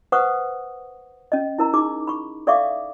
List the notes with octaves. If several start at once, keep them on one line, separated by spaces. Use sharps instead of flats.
B4 C5 F#5 C#6 D#6
C#4 D#5
E4 A#4 A#5
D#4 G#4 D6
B5 C#6
A4 D5 E5 F5 C#6 D6